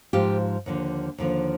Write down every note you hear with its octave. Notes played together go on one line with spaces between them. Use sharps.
G#2 F3 F4 G4
D#2 D3 F3
D#2 D3 F3